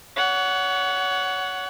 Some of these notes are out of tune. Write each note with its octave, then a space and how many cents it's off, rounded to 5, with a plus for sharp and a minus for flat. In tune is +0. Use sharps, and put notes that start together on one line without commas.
C#5 +30 F#5 +0